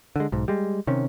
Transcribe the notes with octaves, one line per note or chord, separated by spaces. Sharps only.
D3 G#3
B1 G#2
G3 G#3
C3 D#3 C#4